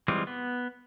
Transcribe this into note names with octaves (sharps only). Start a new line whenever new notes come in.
E3 G3 G#3 C4 F4
B3